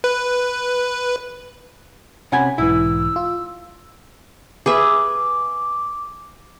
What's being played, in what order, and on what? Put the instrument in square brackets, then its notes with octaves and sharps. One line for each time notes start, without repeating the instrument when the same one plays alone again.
[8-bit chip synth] B4
[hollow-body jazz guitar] C3 F#5 G#5 [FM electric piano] C#4 B5
[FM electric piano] B1 G#2 E3 [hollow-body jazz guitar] E4 [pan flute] E6
[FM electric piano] F4
[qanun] G#4 B4 E5 [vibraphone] D6